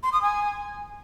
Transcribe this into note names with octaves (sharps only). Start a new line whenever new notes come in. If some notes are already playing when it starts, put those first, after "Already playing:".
C6
D#6
G#5